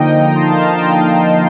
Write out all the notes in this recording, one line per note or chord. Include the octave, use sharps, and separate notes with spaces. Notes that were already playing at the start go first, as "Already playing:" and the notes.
Already playing: D3 F3 A#3 D#4 D#5 G5
G5 A#5
A5 C6
F5 A5
F5 A5
D#5 G5